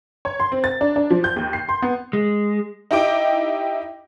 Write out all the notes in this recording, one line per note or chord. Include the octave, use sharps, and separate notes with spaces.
C#5
C6
C4
A6
D4
D4
F3
G6
D#2
C7
C6
B3
G#3
D#4 E4 G4 D#5 G5 D6